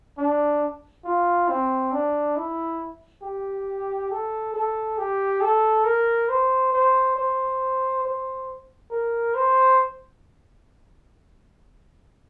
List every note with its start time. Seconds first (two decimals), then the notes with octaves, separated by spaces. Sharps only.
0.18 D4
1.05 F4
1.48 C4
1.92 D4
2.36 E4
3.23 G4
4.11 A4
4.54 A4
4.98 G4
5.41 A4
5.85 A#4
6.29 C5
6.72 C5
7.16 C5
8.04 C5
8.91 A#4
9.35 C5